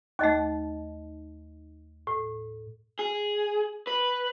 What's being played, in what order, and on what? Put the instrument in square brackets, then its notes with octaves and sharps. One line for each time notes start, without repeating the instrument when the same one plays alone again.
[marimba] D#2 A3 [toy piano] D#4 D#5 D6
[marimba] A2
[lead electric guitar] G#4
B4